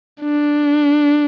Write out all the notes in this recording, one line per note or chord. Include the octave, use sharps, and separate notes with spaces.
D4